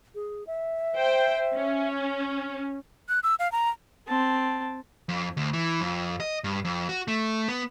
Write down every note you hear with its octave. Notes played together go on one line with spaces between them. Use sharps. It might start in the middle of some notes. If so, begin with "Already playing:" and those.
G#4
E5
C5 G5
C#4
F#6
E6
F5
A#5
C4 A5
F2
D2
E3
F2
D#5
G2
F2
F#4
A3
B3